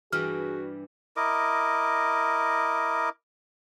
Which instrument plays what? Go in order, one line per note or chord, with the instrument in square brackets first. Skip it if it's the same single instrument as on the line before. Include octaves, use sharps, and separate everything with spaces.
[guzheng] G2 E3 G3 [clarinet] F#4 [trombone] G#4 [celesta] F6
[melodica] E4 A#4 D#5 D6